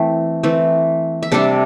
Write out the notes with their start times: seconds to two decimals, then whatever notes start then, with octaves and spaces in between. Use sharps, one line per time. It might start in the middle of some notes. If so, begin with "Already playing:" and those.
Already playing: E3 A3 C4 G5
0.43 E3 A3 C4
1.23 E5
1.32 C3 G3 D4 A4 D5